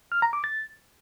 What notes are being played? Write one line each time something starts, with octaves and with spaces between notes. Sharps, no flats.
F6
A#5
D6
A6